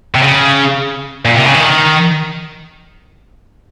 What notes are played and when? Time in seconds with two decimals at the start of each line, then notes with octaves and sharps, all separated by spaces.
0.15 C3
0.22 C#3
1.25 A#2
1.35 C3
1.45 C#3
1.55 D#3